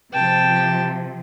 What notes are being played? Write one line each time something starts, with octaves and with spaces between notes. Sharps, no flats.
C3 F3 G5 A5